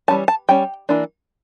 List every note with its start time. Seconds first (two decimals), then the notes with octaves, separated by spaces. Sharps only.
0.08 E3 G3 C#4 A5
0.28 A5
0.49 G3 C#4 G5
0.89 E3 A#3 D4